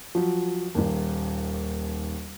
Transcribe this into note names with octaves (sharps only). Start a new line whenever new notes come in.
F3 F#3
D#1 D#2